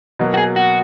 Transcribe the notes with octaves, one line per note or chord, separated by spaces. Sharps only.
B2 F#3 A#3
F#4
G#4
F#4